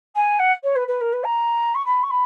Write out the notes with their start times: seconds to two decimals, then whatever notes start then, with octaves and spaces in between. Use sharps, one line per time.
0.15 G#5
0.39 F#5
0.63 C#5
0.75 B4
0.87 B4
1.00 A#4
1.13 B4
1.24 A#5
1.74 C#6
1.85 B5
2.03 C#6
2.10 B5